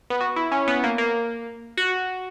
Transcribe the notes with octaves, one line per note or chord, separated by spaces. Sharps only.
B3
F#4
E4
C#4
B3
A#3
A#3
F#4